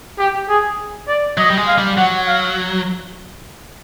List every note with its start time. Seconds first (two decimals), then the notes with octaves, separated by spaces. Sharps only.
0.19 G4
0.49 G#4
1.08 D5
1.38 F#3 D#5
1.50 G3
1.57 G#3
1.68 F5
1.78 G3
1.97 F#3 F#5
2.28 F5